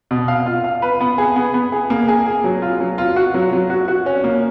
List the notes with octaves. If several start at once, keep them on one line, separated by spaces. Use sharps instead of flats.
B2
F5
F4
F5
B4
B3
G#4
B3
B3
G#4
A#3
G#4
G#4
F#3
F4
F#3
F4
F#4
F#3
F#3
F#4
F#4
C#4
A#3